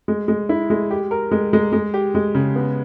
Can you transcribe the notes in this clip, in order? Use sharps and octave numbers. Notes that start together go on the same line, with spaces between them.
G#3
G#3
E4
G#3
G4
A#4
G#3
G#3
G#3
G4
G#3
C#3
B3